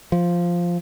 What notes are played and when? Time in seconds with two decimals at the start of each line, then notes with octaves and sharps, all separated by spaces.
0.12 F3